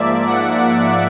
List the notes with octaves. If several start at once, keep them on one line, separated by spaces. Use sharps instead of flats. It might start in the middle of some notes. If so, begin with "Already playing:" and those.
Already playing: G#2 F3 A#3 D5 E5
F#5